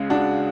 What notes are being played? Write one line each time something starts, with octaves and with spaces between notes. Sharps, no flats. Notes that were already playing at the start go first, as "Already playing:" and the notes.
Already playing: C#2 C#3 G#3
D4 F#4